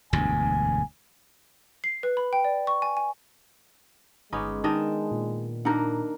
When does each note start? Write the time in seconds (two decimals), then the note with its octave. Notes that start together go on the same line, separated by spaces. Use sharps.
0.13 E1 D2 G2 G#5
1.84 C7
2.03 B4
2.17 B5
2.33 G5
2.44 D5
2.67 C#6
2.82 G#5
2.97 G#5
4.33 G1 G#3 B3 C#4 D#4 D6
4.64 D#3 D4 D#5 A5
5.11 A#2
5.65 A#3 D4 D#4 A#4 F#5